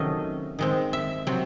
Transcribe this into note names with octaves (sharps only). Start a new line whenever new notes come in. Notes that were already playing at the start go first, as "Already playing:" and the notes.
Already playing: C3 D#3 F#3 A3 C#4 D#5
D#3 G#3 C4
E5
C3 F#3 C4